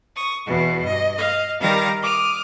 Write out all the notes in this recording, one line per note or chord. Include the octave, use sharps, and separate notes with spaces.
C#6 D#6
E2 B2 E3
G2 D#5
D#5 F5
D#3 G3 A#4 F5 A#5 A#6
D6 D#6 F6